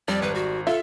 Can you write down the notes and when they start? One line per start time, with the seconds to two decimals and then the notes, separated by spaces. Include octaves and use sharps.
0.08 F2 G3 D5
0.22 G#1 B4
0.35 F#4
0.67 F4 A4 E5